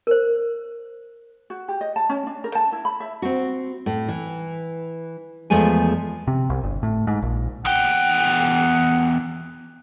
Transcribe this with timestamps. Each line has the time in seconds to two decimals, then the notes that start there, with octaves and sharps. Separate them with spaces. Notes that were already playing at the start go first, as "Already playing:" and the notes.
0.07 A#4 C5
1.50 F#4
1.68 G4
1.81 D#5
1.96 A5
2.09 C#4
2.27 D4
2.44 A#4
2.55 A5
2.72 E4
2.85 B5
3.00 E5
3.22 C4 F#4
3.86 A2
4.08 E3
5.50 E2 F3 G#3 A3 G#5
6.28 C3
6.50 C2
6.64 G1
6.83 A2
7.07 G#2
7.22 A#1
7.65 E2 F#5 G5